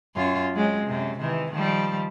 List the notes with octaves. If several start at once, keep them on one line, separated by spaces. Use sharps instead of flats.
F#2 F4
F#3 G#3 C4
F#2 C3
C3 D#3 E3
D#3 F3 G3